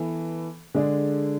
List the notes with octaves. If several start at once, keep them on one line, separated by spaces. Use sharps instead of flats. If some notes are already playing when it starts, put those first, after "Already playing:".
Already playing: E3 B3 A4
D3 G#3 D4 G#4